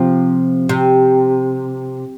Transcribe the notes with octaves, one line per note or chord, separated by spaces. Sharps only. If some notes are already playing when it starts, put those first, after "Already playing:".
Already playing: C3 F3
C3